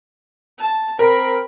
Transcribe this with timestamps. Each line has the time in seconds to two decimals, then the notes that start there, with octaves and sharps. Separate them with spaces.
0.58 A5
0.99 C4 A#4 B5